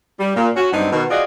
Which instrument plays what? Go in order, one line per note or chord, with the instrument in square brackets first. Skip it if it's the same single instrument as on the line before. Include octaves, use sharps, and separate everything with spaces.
[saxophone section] G3
A#2
C#4 F#4
G2 F#3 G3 B3 C4 D#4
B2 D#3
F4 F#4 G#4 D5 D#5